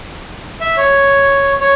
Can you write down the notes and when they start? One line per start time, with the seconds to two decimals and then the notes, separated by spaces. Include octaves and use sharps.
0.61 E5
0.77 C#5
1.61 C#5